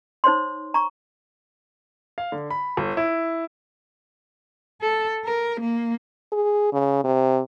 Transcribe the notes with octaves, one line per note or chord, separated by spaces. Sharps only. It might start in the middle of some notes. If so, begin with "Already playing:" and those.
D#4 C5 C#5 C6
A#5 C#6
F5
D3
B5
G1
E4
A4
A#4
A#3
G#4
C#3
C3